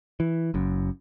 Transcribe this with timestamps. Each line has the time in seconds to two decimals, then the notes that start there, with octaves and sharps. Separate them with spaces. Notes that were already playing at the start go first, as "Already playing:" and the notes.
0.20 E3
0.54 F#1 F#2